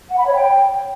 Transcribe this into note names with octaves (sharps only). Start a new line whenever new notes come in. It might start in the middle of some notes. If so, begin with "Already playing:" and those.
F#5
B5
C#5
G5